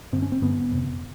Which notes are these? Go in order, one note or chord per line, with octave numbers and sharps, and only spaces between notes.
G2 D3 C4
C#4
C4
G2 D3 B3
F2 C3